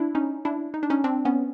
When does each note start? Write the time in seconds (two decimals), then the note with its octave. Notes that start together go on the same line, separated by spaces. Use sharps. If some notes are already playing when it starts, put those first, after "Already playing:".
Already playing: D4 E4
0.15 C#4 D#4
0.45 D4 E4
0.74 D#4
0.83 D4
0.90 C#4 D#4
1.04 C4 D4
1.25 B3 C#4